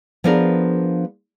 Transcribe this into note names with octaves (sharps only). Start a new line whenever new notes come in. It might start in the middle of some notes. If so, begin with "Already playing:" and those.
F3 B3 D4 G#4 A#4